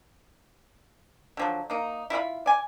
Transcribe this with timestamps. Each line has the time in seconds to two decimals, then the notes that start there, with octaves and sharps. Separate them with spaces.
1.37 D3 F3 F#3
1.70 A#3 D#4
2.10 E4 F4 E5 B5
2.46 D5 G#5